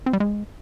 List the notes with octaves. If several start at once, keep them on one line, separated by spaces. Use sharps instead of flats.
C4
G3
G#3